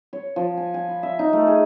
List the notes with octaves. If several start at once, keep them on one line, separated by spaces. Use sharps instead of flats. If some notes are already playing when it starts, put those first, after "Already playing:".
C#5
F3
G#5
G#5
B5
E5
D#4
A3
G#4